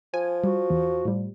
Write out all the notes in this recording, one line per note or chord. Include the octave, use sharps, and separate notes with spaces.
F3 G#5
G3 F#4
E2
A2 G3